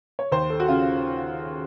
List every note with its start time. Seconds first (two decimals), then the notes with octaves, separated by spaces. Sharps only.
0.19 C#5
0.32 D#2 C5
0.50 A4
0.60 F#4
0.68 C#3 F4